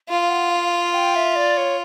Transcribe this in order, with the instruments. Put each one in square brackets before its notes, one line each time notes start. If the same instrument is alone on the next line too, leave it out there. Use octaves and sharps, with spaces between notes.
[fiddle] F4 [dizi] F5
[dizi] F5
F#5
F5
F5
G5
E5
D5
C#5